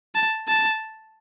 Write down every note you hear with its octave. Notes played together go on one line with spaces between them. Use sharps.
A5
A5